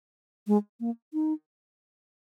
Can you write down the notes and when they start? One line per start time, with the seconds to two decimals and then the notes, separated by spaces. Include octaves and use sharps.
0.47 G#3
0.80 A#3
1.13 D#4